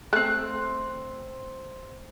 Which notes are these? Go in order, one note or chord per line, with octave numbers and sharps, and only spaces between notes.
A3 C4 F#6